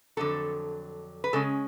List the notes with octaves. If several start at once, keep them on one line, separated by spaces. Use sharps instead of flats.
F2 D3 F#3 A4
B4
C#3 G#3 C#4 A4